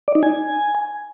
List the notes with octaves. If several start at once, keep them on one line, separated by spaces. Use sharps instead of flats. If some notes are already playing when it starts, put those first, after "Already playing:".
D5
D#4
G#5